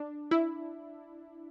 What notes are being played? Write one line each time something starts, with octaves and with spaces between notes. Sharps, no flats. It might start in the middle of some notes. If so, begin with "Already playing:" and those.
Already playing: D4
E4